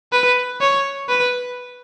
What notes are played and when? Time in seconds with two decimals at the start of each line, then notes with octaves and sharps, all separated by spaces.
0.12 B4
0.61 C#5
1.09 B4